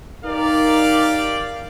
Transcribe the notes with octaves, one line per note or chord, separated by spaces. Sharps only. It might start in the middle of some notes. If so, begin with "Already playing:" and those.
D#4 G4 A#4 D5 F5